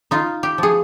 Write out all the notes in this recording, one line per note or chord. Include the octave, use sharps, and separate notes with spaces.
D#4 F4
G4
F3 G#4